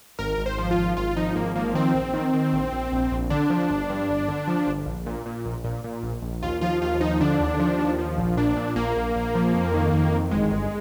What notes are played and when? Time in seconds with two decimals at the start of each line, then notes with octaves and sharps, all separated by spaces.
0.19 G#1 A#4
0.38 G#1
0.46 C5
0.58 F3
0.71 F4
0.78 G#1
0.97 G#1 F4
1.17 F3 D#4
1.36 G#1 A#3
1.55 F3 A#3
1.74 D#3 C4
1.95 A#1
2.14 D#3
2.34 D#3
2.53 A#1
2.72 A#1
2.92 A#1
3.12 A#1
3.30 D3 D4
3.50 F3
3.70 G1
3.90 G2
4.09 G1
4.28 D3
4.48 F3
4.67 G1
4.86 A#1
5.06 A#2
5.26 A#2
5.45 A#1
5.64 A#2
5.84 A#2
6.03 A#1
6.22 A#1
6.43 D#2 F4
6.61 F3 F4
6.81 D#2 F4
7.00 F3 D#4
7.20 D3 D4
7.40 D#2
7.60 F3
7.78 D#2
7.99 F3
8.18 A#1
8.37 A#2 D4
8.57 A#2
8.76 A#1 A#3
8.96 A#1
9.16 A#1
9.35 F3
9.54 F2
9.74 D#3
9.93 F2
10.12 D#3
10.31 G1 G#3
10.51 G1